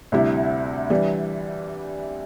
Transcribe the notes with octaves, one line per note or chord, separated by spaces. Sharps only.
D2 C3 G3 E4
E3 G3 D4